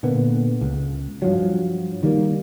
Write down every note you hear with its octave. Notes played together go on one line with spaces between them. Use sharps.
A#2 D3 A#3 B3
C#2
G2 F3 F#3
D#3 G3 A#3